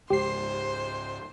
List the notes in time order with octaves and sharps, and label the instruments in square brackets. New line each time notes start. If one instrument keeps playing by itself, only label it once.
[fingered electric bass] C#2 G#2 [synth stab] G4 C7 [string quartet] C5